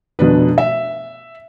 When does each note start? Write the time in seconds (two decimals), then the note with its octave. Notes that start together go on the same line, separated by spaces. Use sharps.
0.19 F1 B2 D4 B4
0.58 E5